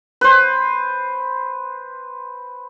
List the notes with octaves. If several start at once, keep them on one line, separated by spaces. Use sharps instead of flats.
B4 C5